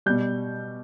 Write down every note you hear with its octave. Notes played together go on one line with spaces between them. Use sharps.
B2 G3 G6